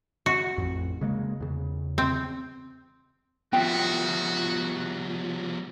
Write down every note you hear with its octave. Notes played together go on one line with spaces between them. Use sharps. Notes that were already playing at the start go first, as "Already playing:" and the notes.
F#4
A1 F2
C#3 G#3 A#3
E2 C#3
C4
F3 G3 B3 F4 F#4 E5 G5